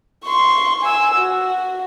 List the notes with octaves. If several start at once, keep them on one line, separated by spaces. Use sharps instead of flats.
C6 C#6
G#5 E6
F#4